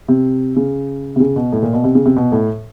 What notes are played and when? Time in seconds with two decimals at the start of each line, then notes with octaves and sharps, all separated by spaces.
0.08 C3
0.57 C#3
1.16 C3
1.20 C#3
1.36 B2
1.53 A2
1.63 A#2
1.73 B2
1.84 C3
1.95 C#3
2.05 C3
2.16 B2
2.32 A2